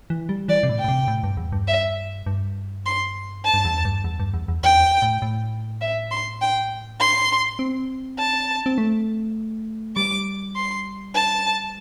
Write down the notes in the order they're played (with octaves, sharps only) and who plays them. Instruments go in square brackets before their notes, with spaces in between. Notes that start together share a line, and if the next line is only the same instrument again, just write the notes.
[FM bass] E3
G3
[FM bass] E3 [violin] D5
[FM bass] C3
A2
[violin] G5
[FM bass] A2
C3
A2
G2
E2
G2
[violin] E5
[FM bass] G2
[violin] C6
A5
[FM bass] G2
E2
G2
E2
G2
E2
E2
[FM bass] E2 [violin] G5
[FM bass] A2
A2
[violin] E5
C6
G5
C6
[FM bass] C4
[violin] A5
[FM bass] C4
A3
[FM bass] G3 [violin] D6
[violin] C6
A5